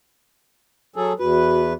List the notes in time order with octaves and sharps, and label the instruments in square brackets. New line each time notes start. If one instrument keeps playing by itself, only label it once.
[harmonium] F#3 G#4 A4
[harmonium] E2 B4 [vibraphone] F#4